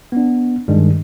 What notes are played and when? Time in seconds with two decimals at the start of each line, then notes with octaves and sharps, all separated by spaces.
0.12 B3 D4
0.68 G2 D#3 G3 G#3 D4